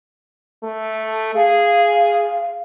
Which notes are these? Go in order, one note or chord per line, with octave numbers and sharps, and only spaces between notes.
A3
G#4 F5